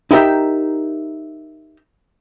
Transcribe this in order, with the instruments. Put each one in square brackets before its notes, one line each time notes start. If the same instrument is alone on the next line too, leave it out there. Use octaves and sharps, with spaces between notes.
[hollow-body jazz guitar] D#4 E4 G4 A#4 E5 G5